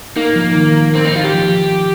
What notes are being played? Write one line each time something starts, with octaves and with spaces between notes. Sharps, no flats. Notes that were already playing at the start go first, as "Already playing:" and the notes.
A#3 D#4
F3
D#3
C4
D#4
F4
G4
F3